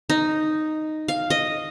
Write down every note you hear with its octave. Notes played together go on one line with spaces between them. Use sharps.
D#4
F5
D#5